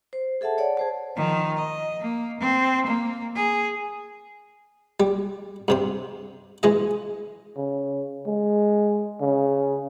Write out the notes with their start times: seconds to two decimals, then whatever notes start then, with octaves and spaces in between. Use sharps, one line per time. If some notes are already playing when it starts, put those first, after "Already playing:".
0.13 C5
0.41 G#4 A4 E5 F#5 A5
0.58 C#5 D5 F#5
0.77 G#4 C5 A5
1.16 D#3 F3
1.55 D#5
2.00 A#3
2.40 C4
2.86 A#3
3.35 G#4
5.00 G3
5.68 G2 C3 C6
6.63 E3 G#3 D#5
7.57 C#3
8.27 G#3
9.21 C#3